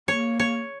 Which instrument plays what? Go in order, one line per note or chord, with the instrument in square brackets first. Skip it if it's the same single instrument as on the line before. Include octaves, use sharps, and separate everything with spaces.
[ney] A#3 [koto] C#5
[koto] C#5